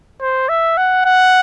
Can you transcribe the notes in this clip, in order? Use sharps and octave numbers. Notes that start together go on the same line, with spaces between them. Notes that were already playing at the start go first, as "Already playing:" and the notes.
C5
E5
F#5
F#5